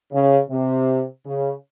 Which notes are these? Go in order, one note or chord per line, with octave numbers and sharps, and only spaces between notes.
C#3
C3
C#3